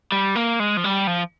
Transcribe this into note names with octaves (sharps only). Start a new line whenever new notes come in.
G3
A#3
G#3
F3
G3
F3